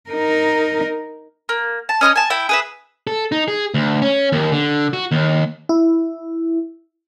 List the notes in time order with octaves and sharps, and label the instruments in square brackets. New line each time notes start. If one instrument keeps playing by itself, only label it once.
[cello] D#4 A#4
[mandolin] A#3
A5
C#4 D#5 C6 F6
G#5 A5
E4 G5
G#4 B4 E5
[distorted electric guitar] A4
D#4
G#4
D2
C#4
D#2
D3
F#4
D#2
[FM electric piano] E4